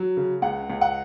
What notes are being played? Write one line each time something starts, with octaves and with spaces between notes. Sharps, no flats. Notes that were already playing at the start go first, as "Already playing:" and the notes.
Already playing: F#3
C#3
C#2 F#5
C#2
F#5